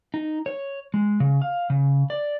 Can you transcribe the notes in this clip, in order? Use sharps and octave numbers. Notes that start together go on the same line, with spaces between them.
D#4
C#5
G#3
C#3
F5
C#3
D5